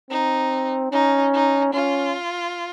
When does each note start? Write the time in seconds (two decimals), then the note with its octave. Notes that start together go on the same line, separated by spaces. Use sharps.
0.10 C4 D#4
0.92 C#4 D#4
1.34 D#4
1.73 C#4 F4